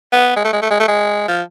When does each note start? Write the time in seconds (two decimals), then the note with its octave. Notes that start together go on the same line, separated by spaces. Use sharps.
0.12 B3
0.36 G#3
0.45 A3
0.53 G#3
0.62 A3
0.71 G#3
0.80 A3
0.88 G#3
1.28 F3